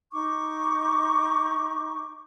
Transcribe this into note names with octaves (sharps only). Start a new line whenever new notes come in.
D#4 C#6 D6